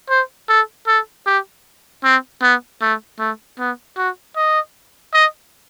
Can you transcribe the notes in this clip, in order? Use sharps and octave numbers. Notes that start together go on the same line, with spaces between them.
C5
A4
A4
G4
C4
B3
A3
A3
B3
F#4
D#5
D#5